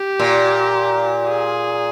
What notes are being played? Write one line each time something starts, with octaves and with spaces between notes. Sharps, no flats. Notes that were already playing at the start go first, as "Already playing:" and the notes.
Already playing: G4
A#2
G#4